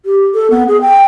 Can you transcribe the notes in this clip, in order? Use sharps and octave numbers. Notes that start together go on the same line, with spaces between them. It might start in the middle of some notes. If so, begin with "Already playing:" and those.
G4
A4
B3
G#4
G5